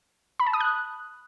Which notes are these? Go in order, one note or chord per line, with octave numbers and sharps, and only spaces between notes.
B5
A5
D#6
F#6